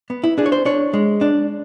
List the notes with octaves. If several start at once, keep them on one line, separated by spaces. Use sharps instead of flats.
B3
E4
D4 G#4
C#5
C5
D4 C#5
G#3
D4